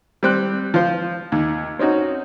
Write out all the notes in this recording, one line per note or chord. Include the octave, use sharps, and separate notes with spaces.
G3 C4 F#6
F3 C5
D#2
C4 C#4 D#4 F#4